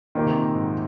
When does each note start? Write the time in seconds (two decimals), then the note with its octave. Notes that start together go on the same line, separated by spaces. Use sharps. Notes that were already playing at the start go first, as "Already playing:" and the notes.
0.15 A#2 D#3 A#3 D#4 G4
0.26 C3
0.35 A#2
0.55 G#2